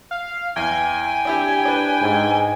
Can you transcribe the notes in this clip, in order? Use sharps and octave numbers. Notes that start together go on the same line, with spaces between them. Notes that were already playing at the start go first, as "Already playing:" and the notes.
F5
E2 G5 G#5
D4 E4 G4
D4 B4
G#2